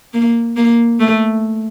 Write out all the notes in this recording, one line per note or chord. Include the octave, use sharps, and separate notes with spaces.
A#3
A#3
A3